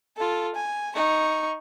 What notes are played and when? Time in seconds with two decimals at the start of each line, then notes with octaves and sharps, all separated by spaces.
0.17 F4 A4
0.55 G#5
0.95 D#4 C#6